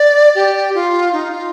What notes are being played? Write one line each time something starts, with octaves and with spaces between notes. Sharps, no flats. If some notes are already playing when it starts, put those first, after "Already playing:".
Already playing: D5
G4
F4
D#4
F4